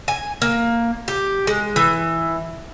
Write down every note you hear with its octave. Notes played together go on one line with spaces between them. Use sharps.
G#5
A#3
G4
G#3
E3